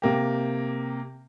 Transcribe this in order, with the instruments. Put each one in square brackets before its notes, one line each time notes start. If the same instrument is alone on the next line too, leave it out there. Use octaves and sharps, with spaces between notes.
[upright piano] C3 A#3 G4